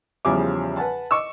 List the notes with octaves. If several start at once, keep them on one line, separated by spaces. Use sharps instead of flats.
E2 C#3 F3 G3 G#5 D6
B4 F#5 G#5 A5
D#5 C#6 D6 E6